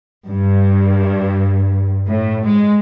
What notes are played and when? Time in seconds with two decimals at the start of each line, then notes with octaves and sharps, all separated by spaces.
0.28 G2
2.06 A2
2.45 G#3